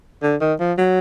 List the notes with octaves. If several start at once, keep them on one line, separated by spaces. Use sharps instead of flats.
D3
D#3
F3
F#3